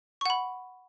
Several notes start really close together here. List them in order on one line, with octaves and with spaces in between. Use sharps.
C#6 F#5 B5